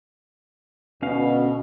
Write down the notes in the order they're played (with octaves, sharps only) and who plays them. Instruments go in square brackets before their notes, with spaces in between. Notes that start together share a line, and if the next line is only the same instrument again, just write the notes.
[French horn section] D2 B2 [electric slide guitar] C#4 F5